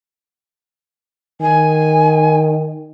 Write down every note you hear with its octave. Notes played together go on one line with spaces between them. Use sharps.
D#3 G#5